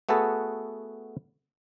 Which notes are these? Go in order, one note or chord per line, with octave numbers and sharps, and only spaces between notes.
A3 B3 F#4 G#4 A4 B4